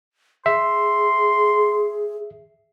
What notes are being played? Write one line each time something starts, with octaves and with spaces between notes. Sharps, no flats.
G#4 E5 C6